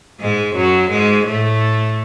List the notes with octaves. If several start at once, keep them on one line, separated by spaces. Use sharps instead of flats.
G#2 G#3
F#2 F#3
G#2 G#3
A2 A3